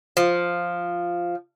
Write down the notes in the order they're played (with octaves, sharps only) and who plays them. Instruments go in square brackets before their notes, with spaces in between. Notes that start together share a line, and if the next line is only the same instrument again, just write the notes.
[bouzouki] F3